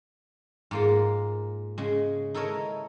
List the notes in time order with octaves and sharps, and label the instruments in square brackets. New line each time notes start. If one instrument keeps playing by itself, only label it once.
[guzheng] G#2 A#3 F4
C#3 G#3
D#4 E4 A4 A#4 C#5 D#5